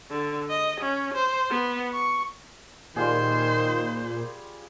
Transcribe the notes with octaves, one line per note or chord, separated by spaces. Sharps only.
D3
D#5
C#4
C5
B3
C#6
A#2 D#3 G3 F4 G#4 C5